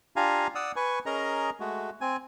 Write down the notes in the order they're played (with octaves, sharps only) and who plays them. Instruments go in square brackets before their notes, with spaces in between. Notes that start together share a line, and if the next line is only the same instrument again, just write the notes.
[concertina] D4 F4 G4 F5 G#5 A#5
D5 F#5 D#6 E6
B4 G#5 C#6
C#4 G#4 A#4 D#5 A#5
G#3 A3 F#4
C4 G#5